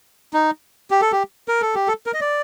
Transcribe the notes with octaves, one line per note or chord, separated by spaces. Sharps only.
D#4
G4
A4
G4
A#4
A4
G4
A4
A#4
D#5
D5